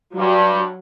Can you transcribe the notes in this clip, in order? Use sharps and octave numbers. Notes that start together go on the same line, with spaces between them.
G2 F#3